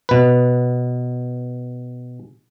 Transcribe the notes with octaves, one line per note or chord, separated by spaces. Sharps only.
B2 B4